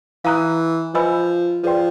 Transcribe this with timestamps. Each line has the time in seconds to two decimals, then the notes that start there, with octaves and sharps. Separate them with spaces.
0.25 E3 F5 A#5 D#6 F#6
0.94 F3 B4 D#5 G#5 B5 E6
1.63 F3 G#4 B4 D5 G5 C6